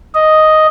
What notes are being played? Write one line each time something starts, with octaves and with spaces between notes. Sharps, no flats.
D#5